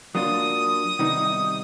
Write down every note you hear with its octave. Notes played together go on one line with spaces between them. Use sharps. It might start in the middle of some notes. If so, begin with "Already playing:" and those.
F#3 A#3 D4 F4 D#6
C3 D#3 G3 B3 D#4